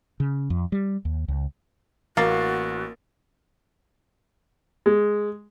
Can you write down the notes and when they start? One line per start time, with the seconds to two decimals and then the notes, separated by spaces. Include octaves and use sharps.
0.20 C#3
0.50 F2
0.72 G3
1.05 D#2
1.28 C#2
2.17 A1 A#3 F#4 A6 C7
4.86 G#3